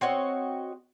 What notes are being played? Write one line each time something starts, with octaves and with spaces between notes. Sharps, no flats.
C4 F#4 C#5 D#5